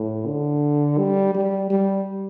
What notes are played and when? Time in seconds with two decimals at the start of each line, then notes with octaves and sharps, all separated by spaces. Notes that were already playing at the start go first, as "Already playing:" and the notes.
Already playing: A2
0.26 D3
0.98 G3
1.35 G3
1.70 G3